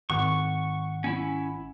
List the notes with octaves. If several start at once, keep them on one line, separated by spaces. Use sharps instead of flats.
G#1 F#5 C#6
C#4 E4